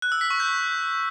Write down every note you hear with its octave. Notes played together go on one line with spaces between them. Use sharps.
F#6
E6
B6
C#6
G6